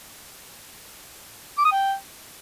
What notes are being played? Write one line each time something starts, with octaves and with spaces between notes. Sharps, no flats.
D6
D#6
G5